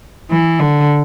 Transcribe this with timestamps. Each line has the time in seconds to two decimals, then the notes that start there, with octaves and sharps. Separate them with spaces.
0.31 E3
0.59 D3